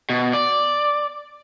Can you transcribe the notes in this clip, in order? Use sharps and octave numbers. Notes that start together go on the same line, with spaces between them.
B2
D5